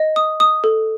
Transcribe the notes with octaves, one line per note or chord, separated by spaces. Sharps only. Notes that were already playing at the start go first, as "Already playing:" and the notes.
Already playing: D#5
D#6
D#6
A4